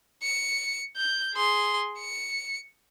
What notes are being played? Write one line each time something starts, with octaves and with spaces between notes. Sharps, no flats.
C#7
G6
G#4 C6
C#7